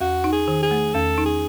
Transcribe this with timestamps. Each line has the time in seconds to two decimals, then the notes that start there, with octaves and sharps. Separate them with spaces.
0.01 E2 F#4
0.24 D#4
0.32 G#4
0.48 D#3
0.63 G#4
0.71 A3
0.94 E2 A4
1.18 D#4
1.26 G#4